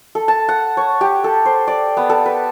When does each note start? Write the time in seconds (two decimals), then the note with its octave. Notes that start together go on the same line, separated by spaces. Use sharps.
0.15 A4
0.28 A5
0.49 F#5
0.77 C#5
1.01 G4
1.24 A4
1.45 C5
1.68 D5
1.97 B3
2.10 A4
2.26 B4